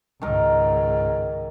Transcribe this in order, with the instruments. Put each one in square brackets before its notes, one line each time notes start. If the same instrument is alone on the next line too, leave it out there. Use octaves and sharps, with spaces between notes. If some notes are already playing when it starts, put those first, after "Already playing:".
[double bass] C#2 G#2 [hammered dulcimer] D#3 A#4